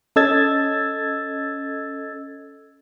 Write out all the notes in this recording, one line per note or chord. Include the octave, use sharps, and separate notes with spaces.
C#4 A4 D#5 E6 G#6 A6